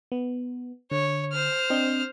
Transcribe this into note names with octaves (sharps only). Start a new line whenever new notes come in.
B3
D3 C#5
C5 F6
C4 D4 D#5